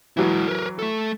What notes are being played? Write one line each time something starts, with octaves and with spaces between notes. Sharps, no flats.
E3 F#3 G#3 E4
A#4 B4
A3 A4